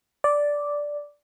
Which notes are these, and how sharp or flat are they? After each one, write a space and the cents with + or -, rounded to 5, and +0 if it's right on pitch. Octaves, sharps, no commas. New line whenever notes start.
D5 -5